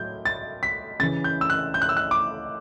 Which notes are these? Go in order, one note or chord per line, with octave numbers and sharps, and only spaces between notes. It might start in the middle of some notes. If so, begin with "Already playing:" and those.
Already playing: A2 F#3 G6
A6
B6
C#3 E3 A6
G6
E6
F#6
G6
F#6
E6
F#6
D6